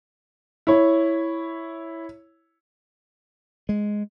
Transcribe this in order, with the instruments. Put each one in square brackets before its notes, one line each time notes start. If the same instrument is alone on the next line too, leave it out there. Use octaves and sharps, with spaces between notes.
[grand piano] E4 C#5
[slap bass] G#3